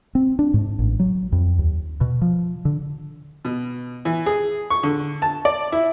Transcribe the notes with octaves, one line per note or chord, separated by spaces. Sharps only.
C4
D4
G#2
A1
F#3
F2
D#2
B2
F3
D3
B2
E3
G#4
C#6
D3
A5
D5
E4